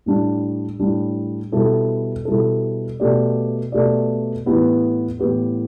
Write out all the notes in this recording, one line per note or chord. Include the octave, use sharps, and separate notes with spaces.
A2 G3 D4
A2 G3 D4
B2 G3 E4 A4
B2 G3 E4 A4
B2 A3 G4 D5
B2 A3 G4 D5
A2 E3 B3 G4 B4
A2 E3 B3 G4 B4